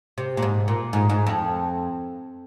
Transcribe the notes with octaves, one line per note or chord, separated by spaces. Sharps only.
C3
A#2
G#2
A#2
G#2
G#2
F2